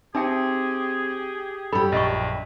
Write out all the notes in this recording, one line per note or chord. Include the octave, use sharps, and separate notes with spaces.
C4 D#4 G4 G#4 E5 G5
F#2 G3 A4 B5
A#1 D#5 C#6